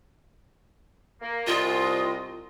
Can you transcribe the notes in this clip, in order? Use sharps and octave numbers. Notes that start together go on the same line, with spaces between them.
A#3
C2 F4 D#5